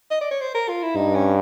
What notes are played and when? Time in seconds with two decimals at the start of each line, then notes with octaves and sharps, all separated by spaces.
0.11 D#5
0.21 D5
0.31 C#5
0.41 C5
0.54 A#4
0.69 F4
0.83 E4
0.96 G2 D#4
1.15 C#4